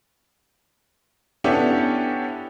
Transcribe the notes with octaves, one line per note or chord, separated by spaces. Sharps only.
B3 C#4 D4 E4 G4 A4